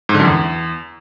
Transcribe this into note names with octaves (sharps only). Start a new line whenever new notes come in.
G#2
D3
F#2
E2